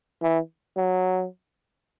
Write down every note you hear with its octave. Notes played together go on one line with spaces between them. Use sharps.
E3
F#3